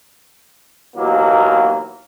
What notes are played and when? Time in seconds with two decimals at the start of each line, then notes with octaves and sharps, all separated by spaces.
0.96 D#2 B2 E3 F#3 A#3